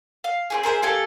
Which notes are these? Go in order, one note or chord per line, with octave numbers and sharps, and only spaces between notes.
F5
C4 G4 G#4
G#4 A#4 C5 E5
A#3 G4 A4 G#5